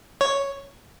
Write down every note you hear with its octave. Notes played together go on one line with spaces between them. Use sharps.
C#5